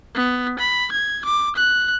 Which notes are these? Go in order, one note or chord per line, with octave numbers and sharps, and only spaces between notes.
B3
B5
G#6
D6
F#6